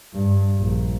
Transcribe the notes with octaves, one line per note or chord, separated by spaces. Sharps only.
G2
A#1